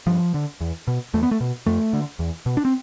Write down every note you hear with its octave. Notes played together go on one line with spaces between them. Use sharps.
G2 F3
D3
E2
B2
E2 A3
B3
A3
B2
F2 A3
D3
E2
B2
D4
C4